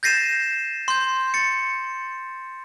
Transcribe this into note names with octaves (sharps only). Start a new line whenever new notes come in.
G6 A6 A#6 C7 D#7 E7
C6 G6
A6 C#7